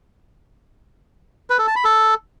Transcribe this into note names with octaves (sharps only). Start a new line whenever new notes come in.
B4
A4
A5
B5
A4